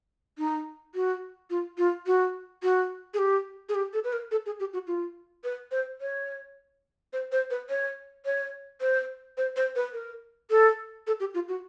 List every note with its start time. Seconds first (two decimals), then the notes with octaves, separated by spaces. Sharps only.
0.38 D#4
0.95 F#4
1.50 F4
1.78 F4
2.07 F#4
2.63 F#4
3.14 G#4
3.19 G4
3.69 G#4
3.75 G4
3.93 A4
4.04 B4
4.13 A#4
4.31 A4
4.46 G#4
4.60 G4
4.73 F#4
4.87 F4
5.44 B4
5.71 C5
6.01 C#5
7.13 C5
7.32 C5
7.50 B4
7.69 C#5
8.25 C#5
8.81 C5
9.37 C5
9.56 C5
9.76 B4
9.93 A#4
10.50 A4
11.07 A4
11.20 G4
11.34 F4
11.49 F#4